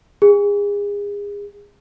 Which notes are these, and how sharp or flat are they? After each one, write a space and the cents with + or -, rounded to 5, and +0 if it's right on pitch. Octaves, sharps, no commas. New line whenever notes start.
G#4 -30